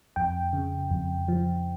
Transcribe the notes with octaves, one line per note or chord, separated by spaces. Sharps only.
F2 G5
C#3
F2
F3